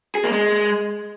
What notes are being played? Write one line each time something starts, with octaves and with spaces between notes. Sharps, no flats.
G#4
A#3
G#3